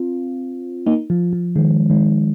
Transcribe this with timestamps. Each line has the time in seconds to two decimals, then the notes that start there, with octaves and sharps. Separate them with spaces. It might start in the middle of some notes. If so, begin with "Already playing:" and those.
Already playing: C4 F4
0.86 A#3 D#4
1.10 F3
1.33 F3
1.56 D#3 G#3
1.90 D#3 G#3